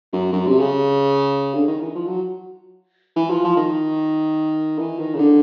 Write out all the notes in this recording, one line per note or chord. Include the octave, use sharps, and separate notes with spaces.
F#2
F#2
C3
C#3
D3
D#3
E3
F3
F#3
E3
F3
F3
D#3
E3
D#3
C#3
D3